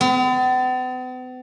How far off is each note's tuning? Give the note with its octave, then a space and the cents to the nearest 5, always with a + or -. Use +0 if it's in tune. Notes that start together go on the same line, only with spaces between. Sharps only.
B3 +45